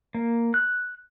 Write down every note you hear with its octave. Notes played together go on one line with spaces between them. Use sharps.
A#3
F#6